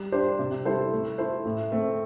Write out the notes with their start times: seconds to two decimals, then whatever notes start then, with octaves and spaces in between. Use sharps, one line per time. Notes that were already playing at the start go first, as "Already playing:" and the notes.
Already playing: G3
0.12 D4 G4 C5
0.39 C3
0.65 G3 E4 A4 C5
0.92 A3
1.18 E4 A4 C5
1.45 A2
1.72 A3 C4